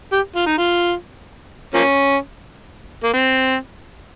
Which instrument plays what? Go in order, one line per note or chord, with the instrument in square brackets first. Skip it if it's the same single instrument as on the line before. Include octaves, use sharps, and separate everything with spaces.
[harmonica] G4
F4
D#4
F4
F3 A#3 C#4
A#3
C4